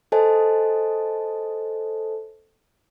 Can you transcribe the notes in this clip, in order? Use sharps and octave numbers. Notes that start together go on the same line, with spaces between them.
A4 C5 D#5 G#5 A5